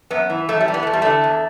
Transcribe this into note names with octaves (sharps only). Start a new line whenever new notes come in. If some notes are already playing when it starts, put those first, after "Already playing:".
F#2 B3
E3
F#2 A3
G3
E3
B3
E2 A3
G3
D3 A3
E2